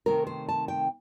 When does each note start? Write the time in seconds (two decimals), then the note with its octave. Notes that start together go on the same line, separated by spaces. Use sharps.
0.06 C3 D#3 A3 C4 A#4
0.27 C5
0.49 A5
0.68 G5